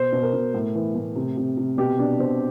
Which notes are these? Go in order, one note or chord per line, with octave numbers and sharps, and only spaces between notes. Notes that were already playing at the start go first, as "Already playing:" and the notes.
Already playing: B2 C5
B2
A#4
B2
A2
E3
A2
C3
C3
C3
B2 G4
B2 D4
B2 C4